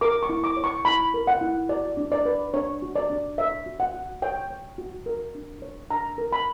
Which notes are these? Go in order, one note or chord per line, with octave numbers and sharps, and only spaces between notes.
A#4 D6
C#6
E4
D6
C#5
C#6
E4 B5
A#4
F#5
E4
F#4 D5
D4
D5
B4
D4 C#5
F#4
D5
D4
C#5 E5
F#4
F#5
F#4
C#5 G5
C#5
F#4
A#4
D4
C#5
D4 A#5
A#4
B5